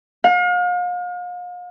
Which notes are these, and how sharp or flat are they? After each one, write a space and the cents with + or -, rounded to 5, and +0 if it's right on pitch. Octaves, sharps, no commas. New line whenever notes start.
F5 +40